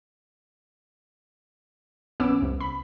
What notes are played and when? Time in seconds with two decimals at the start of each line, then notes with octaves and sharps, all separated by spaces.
2.20 A#1 B3 C#4 D6 E6
2.42 C2
2.61 B5